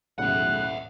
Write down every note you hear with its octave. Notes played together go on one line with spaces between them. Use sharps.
B1 A2 C#3 E5 F#5 F#6